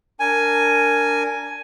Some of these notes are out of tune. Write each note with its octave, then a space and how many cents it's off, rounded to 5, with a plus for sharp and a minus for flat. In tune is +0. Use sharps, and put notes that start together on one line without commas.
D4 -15 A#4 -15 G#5 +5